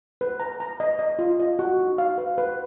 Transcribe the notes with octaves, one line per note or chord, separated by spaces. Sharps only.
B4
A#5
A#5
D#5
D#5
F4
D#5
F#4
D#4
F5
B4
B4